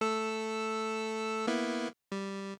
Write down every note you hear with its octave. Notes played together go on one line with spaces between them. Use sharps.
A3 A4 E6
A#3 B3 E4
G3